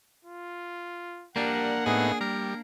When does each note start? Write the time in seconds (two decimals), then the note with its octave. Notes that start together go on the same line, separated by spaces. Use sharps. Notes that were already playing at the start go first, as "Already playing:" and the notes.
0.25 F4
1.36 G3 A#3 D4 A#4 F#5
1.86 A2 B3 D#4 G#4
2.21 G3 A#4